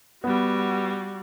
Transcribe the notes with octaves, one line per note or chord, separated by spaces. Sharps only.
G3 B3 F#4